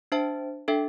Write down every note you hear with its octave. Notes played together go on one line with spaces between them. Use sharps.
D4 C5 E5 A5
D4 A4 E5 G5